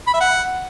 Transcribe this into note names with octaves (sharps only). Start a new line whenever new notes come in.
B5
E5
F#5